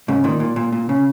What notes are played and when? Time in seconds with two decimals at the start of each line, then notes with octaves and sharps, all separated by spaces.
0.08 G#2 C#3
0.24 A#2 D#3
0.40 A#2
0.56 A#2
0.72 A#2
0.89 C#3